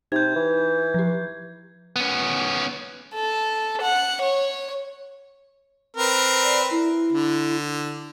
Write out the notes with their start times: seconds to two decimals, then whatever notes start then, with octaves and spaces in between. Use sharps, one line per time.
0.12 C3 D#4 G6 G#6
0.36 E3
0.94 F3 G4
1.96 B3 C#4
3.15 A4
3.82 F#5
4.22 C#5
5.96 C4 A#4 B4
6.43 D5
6.71 E4
7.12 D3